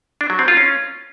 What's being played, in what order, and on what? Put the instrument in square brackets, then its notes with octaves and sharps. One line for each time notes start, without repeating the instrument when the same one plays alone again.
[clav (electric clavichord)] D4
F#3
C4
F4
C#4